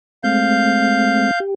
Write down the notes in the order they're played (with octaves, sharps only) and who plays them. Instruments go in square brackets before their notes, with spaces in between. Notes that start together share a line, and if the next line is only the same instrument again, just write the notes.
[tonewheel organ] G#3 A3 C4 [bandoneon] F5 G6
[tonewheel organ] G4